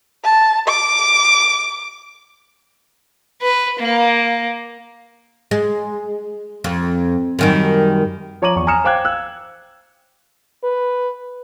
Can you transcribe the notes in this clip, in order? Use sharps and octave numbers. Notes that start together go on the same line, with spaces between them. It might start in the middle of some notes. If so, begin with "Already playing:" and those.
A5
D6
B4
A#3
G#3
F2
F#2 D#3 G3
F3 C#5 A#5 D6 D#7 F#7
E2 C#6
G#5 A#5 D#6 F6 C#7 E7
C5 F5 G5 D6 F#6 G#6
F5 E6 F#6
B4